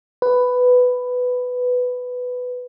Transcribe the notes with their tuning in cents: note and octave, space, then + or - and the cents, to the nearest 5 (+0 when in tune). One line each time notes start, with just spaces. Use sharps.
B4 +10